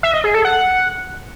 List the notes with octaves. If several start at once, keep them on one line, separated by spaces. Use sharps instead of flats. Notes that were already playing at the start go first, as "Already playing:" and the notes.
E5
D#5
G#4
A4
F#5